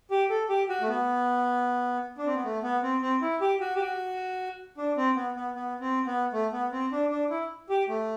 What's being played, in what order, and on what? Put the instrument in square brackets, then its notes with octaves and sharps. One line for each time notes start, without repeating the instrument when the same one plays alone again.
[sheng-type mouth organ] G4
A4
G4
F#4
A3
B3
D4
C4
B3
A3
B3
C4
C4
E4
G4
F#4
G4
F#4
D4
C4
B3
B3
B3
C4
B3
A3
B3
C4
D4
D4
E4
G4
A3